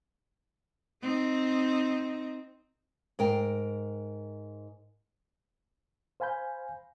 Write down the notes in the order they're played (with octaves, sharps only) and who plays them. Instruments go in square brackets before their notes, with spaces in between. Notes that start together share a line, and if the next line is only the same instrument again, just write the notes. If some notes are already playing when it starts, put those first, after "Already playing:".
[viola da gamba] C4 D#4
[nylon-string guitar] G#2 A#4 G5
[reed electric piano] C5 F5 G#5 B5 G6